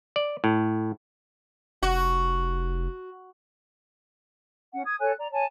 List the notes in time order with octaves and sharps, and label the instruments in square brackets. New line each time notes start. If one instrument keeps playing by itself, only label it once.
[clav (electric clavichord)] D5
A2
[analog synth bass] F1 [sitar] F#4
[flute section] C#4 F#5
D#6 G#6
A4 C#5 G#5 F#6
D5 A#5
C#5 G#5 A5